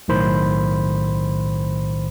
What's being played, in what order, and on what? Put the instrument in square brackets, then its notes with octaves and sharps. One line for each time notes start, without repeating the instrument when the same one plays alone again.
[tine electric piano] B1 A2 D#3 C5 B5